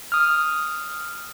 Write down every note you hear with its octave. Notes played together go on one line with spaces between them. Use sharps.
D#6 F6